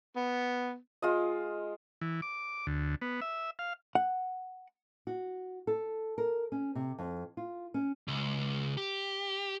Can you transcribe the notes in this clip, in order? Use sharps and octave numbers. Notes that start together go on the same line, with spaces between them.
B3
G#3 F4 D#5
E3
D6
D2
B3
E5
F5
F#5
F#4
A4
A#4
C#4
C3
F2
F4
C#4
C#2
G4